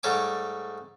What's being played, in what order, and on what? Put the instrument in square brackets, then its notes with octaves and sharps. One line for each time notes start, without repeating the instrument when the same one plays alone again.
[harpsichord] G#2 G3 A3 C#5 G#5 D6